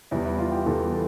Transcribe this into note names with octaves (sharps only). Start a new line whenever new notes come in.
E2 E3 G3 E4
E4
F4
G4
E2 E3 G3 A4
A4